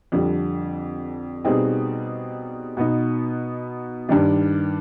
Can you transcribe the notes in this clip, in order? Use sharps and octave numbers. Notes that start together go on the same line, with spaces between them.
F2 D3 G3
B2 G3 C4 D#4 G#4
B2 B3 D#4
G2 D#3 G3 D4